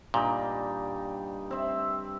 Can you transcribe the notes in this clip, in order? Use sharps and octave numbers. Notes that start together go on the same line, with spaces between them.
G2 A#2 D#4 G5
C4 E5